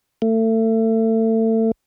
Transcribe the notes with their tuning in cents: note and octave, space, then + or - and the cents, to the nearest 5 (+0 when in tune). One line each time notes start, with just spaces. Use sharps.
A3 +30